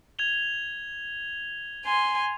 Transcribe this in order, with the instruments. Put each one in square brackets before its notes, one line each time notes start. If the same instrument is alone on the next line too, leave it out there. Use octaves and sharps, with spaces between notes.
[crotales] G#6 F7 G7
[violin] G#5 C6